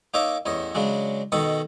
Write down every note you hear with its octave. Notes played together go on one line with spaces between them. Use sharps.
A#3 D#4 C#5 D#5 E5 D6
A1 E2 C#5 D#5
C#3 F#3 G#3 D4
B2 D#3 A4 C#6 D#6